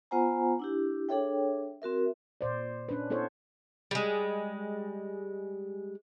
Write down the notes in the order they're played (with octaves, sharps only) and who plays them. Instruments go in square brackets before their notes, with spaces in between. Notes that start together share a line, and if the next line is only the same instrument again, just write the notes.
[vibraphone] B3 F4 C5 F#5 G#5 A#5
D4 E4 G4
D4 G#4 A4 C#5 E5 G5
C4 F#4 A#4 E5
[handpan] A#2 C5 D5
C#4 D4 B4
B3 E4 A4 C5 C#5
[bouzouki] G3 G#3